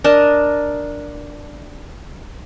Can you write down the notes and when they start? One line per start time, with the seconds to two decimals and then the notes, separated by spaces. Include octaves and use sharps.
0.04 D4 A#4 D#5 A5